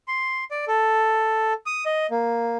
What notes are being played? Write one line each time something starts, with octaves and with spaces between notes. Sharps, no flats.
C6
D5
A4
D#6
D#5
A#3